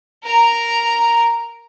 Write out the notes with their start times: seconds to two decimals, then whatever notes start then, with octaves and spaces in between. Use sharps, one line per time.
0.24 A#4 A#5